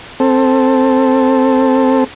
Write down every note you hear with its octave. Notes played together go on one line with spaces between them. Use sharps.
C4 A4